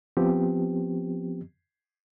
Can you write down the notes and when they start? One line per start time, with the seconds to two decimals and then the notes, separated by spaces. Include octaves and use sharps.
0.17 F3 B3 C4 G4